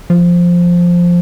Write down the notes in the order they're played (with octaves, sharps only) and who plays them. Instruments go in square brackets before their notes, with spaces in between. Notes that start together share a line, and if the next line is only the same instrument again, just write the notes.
[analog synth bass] F3